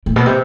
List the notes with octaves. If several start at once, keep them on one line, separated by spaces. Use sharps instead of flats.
A2
B2
C3